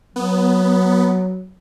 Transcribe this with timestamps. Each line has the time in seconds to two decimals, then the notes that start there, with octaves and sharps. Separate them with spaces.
0.16 F#3 B3